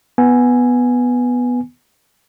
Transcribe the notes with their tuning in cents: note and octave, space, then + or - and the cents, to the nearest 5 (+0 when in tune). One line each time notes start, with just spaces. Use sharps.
B3 +0 G#5 +0